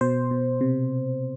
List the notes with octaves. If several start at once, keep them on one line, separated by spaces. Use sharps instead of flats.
B2 C5
B2
C3